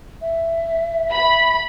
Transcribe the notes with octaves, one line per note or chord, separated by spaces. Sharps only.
E5
B5